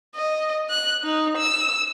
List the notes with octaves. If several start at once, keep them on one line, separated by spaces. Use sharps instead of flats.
D#5
F#6
D#4
E6